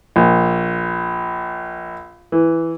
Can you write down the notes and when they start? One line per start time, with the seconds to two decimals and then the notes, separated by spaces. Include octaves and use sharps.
0.16 A#1
2.32 E3